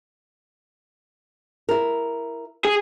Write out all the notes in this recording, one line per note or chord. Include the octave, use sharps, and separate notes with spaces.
E4 A#4
G#4